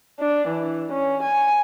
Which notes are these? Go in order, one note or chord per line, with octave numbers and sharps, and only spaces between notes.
D4
E3
C#4
G#5